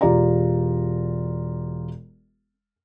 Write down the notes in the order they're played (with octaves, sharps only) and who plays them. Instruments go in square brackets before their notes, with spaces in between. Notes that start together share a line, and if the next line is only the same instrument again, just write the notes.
[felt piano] E1 F4 G4 D5 A#5